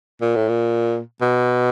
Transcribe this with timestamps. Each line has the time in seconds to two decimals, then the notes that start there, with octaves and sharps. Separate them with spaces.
0.21 A#2
0.36 A2
0.49 A#2
1.21 B2